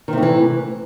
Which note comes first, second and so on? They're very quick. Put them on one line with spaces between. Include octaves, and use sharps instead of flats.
D#3 C3 A3 E3